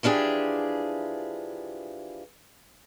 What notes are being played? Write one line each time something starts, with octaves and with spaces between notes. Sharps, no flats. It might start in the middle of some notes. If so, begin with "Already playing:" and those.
E3 F3 D4 G4 G#4